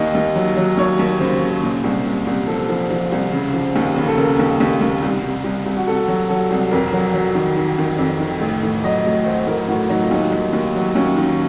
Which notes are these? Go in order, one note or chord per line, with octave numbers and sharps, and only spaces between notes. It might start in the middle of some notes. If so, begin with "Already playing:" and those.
Already playing: D#2 D#5
D#2
F#3
F#3
D#2 C#5
D#2
C#3 C5
C#3
A#2
C2
C2
C2
F3 A4
F3
F3
C2
C#3
F3
D#2
C#3
A4
C#3 A#4
D#2
D#2
D#2
C2
C2
C2
C2
F#4
C2 A4
F#3
F#3 A4
C2
F2 A#4
F#3
F#3
D#3
D#3
D#3
F2
D#3
A1
A2
F#3 D#5
A1
F#3 C5
A2 A#4
A2 F#4
F#3 D#4
F4
D#2 D#4
D#2
D#2
F#3
D#2 C#4
D#3